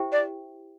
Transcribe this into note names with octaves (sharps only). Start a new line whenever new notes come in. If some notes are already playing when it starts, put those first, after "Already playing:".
Already playing: E4 G4 C5 E5 G5
D5